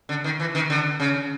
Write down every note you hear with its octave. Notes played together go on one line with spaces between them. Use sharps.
D3
D#3
E3
D#3
D3
C#3